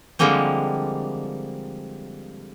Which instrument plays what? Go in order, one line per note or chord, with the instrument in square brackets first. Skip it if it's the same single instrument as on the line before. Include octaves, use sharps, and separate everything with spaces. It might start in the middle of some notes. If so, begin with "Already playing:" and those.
[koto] D3 F3 G3 G#3 A#3 C4